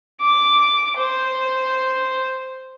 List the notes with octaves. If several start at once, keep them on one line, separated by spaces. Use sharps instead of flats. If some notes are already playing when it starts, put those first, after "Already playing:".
D6
C5